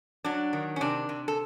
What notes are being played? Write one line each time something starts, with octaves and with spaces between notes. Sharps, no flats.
F#3 D4
D#3
C#4
C3 D4
C3
A4